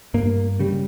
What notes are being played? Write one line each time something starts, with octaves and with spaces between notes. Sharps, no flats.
G2 A#3
C#3 G3